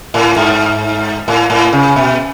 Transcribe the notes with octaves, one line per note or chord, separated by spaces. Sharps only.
A2
G#2
A2
A2
C#3
B2